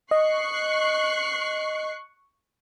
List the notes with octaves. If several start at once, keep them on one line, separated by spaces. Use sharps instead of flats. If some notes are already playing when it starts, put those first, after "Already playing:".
D#5 C#6 F#6 C7